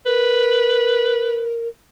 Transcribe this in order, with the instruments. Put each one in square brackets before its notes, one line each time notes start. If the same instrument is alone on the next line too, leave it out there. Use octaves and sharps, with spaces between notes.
[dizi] A#4 [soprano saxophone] B4